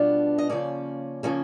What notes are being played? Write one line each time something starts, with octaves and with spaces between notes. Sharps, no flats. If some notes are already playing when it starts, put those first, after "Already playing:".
Already playing: B2 G3 B3 D4 F4
D#5
C#3 F3 A#3 C#4 D5
C#3 F3 A#3 C#4